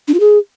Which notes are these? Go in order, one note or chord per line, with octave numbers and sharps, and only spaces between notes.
D4
F4
G#4